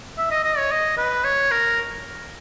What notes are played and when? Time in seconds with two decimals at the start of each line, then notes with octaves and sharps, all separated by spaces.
0.18 E5
0.31 D#5
0.44 D#5
0.58 C#5
0.71 D#5
0.98 B4
1.24 C#5
1.51 A#4